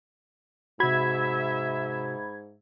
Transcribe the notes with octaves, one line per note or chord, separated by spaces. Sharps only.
G#2 C3 F#4 E5 B5 G#6